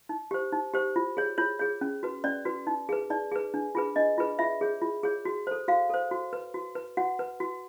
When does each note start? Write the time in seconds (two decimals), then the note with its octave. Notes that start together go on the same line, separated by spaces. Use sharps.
0.09 D#4
0.31 G4 C5
0.53 D#4
0.74 G4 C5
0.96 F4
1.17 G#4 C#5
1.38 F4 C#5
1.59 G#4 C#5
1.81 C#4
2.03 F#4 B4
2.24 C#4 D5
2.45 F#4 B4
2.67 D#4
2.89 G#4 B4
3.10 D#4 D5
3.32 G#4 B4
3.54 D4
3.75 F4 G#4 B4
3.96 D4 D#5
4.18 F4 G#4 B4
4.39 F4 E5
4.61 G#4 C#5
4.82 F4
5.03 G#4 C#5
5.25 F#4
5.47 A4 C5
5.68 F#4 F5
5.90 A4 C5
6.11 F#4
6.33 B4
6.54 F#4
6.75 B4
6.97 F#4 F#5
7.19 B4
7.40 F#4